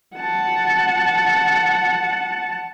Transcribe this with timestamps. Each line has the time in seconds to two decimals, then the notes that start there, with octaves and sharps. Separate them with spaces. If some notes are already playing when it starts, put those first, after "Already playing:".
0.16 F#5 A5